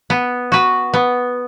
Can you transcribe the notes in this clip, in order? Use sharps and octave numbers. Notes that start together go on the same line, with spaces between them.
B3
F#4 B4
B3